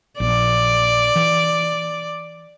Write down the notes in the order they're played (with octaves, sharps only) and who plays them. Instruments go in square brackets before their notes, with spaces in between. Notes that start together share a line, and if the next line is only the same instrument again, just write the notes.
[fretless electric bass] A#1 [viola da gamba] D5
[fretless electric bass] E3